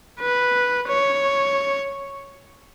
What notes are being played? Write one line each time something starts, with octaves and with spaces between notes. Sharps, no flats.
B4
C#5